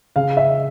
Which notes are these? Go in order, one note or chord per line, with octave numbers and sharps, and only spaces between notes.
C#3 F5
E5